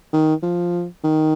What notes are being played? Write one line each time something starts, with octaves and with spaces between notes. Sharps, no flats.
D#3
F3
D#3